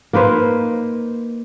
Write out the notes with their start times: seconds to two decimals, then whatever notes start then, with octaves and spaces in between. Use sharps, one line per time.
0.13 A#3 D#4 B4 C5